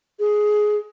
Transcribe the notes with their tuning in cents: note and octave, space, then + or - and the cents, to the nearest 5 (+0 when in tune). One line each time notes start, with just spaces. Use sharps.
G#4 +10